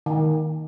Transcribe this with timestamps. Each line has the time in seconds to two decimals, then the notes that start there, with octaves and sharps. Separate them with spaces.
0.06 D#3